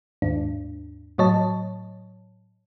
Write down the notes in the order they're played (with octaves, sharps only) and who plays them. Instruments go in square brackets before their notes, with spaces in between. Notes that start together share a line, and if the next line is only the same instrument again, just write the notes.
[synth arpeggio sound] G#1 D#2 G#2 D4
A2 F#3 C#5 D#5 A5